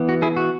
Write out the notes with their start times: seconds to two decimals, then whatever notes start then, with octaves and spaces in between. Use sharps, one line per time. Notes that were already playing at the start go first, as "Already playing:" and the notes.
Already playing: E3 B3
0.09 F#4
0.22 E4 G#4
0.37 F#4